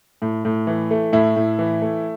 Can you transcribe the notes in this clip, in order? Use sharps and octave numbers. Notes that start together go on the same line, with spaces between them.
A2
A2
E3
A3
A2 E4
A2
E3
A3